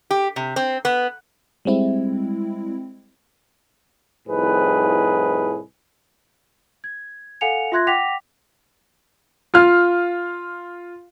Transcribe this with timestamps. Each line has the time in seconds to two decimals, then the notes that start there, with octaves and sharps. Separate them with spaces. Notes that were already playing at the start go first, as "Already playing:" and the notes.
0.11 G4
0.36 C3
0.56 C4
0.85 B3
1.65 G3 G#3 C4 E4
4.28 C2 A2 F3 D#4 G#4 B4
6.84 G#6
7.41 A4 F5 F#5 G#5 C#7 F7
7.72 F4 E5 C6 F#6 G#6 A#6
7.87 F#5 G5 D6 A#6 B6 F7
9.54 F4 F5 F6